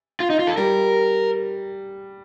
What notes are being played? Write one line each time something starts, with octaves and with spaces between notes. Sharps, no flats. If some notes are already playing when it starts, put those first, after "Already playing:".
F4
D#4
F4
A4
G3 A#4